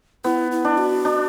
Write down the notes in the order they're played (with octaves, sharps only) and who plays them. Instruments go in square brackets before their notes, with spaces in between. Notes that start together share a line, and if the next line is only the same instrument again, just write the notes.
[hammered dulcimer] B3 [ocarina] E4
[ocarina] E4
[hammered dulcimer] D4
[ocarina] F#4
[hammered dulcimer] D4